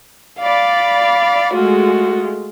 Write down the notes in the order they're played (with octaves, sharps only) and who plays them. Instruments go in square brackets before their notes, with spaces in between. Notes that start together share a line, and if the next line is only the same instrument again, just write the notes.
[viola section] D5 B5 [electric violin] F5
[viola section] G#3 A3 F4 [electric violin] F#4